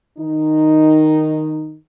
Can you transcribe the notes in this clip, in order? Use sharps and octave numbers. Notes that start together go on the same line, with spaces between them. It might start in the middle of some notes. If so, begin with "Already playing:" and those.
D#3 D#4